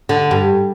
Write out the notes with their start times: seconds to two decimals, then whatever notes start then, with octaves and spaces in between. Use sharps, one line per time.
0.09 D3
0.31 G2